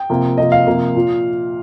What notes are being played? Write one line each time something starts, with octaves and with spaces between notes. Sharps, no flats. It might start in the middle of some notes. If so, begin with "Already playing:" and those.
Already playing: G5
C3 F3 A#3
C3 F3 A#3 D#5
F5
C3 F3 A#3
A#2